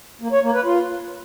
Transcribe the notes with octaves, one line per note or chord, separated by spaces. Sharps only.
A#3
C#5
A#3
B4
F4